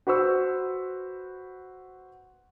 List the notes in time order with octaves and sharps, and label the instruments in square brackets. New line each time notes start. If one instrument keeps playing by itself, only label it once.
[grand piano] F#4 B4 C5 C#6 E6